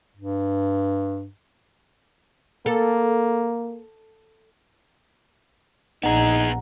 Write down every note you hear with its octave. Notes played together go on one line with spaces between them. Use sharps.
G2
A#3 A4
A#1 B3 D#4 G#4 F#5 A#5